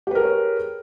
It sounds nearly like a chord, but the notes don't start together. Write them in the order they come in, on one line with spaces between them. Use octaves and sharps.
G4 B4 A#4 G#4 C#5